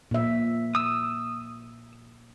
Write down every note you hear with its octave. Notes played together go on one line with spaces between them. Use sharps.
A#2 E5
D#6 E6